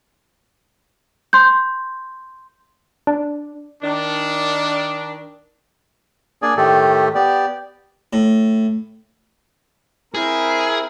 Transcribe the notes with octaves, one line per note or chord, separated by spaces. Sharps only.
C6 G6
D4
D#3 D4
A#3 D4 G#4 D5 G#5
A2 D#3 A3 G4 A4
B3 G4 D5
A2
C4 E4 G#4 A#4